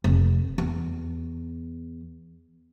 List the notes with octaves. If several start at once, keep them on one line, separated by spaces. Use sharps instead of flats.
F1
E2